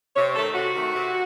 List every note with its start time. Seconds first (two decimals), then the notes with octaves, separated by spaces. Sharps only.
0.16 C3 C#5
0.35 D#3 A3 A4
0.55 C3 F#4
0.75 D#3 A3
0.95 C3